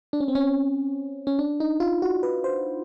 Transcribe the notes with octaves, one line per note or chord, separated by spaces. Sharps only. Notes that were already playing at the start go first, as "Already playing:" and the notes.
D4
C#4
C4
C#4
C#4
D4
D#4
F4
F#4
B4
C5